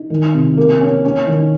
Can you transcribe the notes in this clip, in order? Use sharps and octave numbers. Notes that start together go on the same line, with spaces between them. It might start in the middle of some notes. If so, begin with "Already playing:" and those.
Already playing: D#4
D#3
C3
A#3
C#4
C#4
D#3